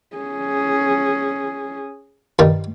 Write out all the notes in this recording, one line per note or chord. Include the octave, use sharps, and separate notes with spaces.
C#4 G#4
G2 D#3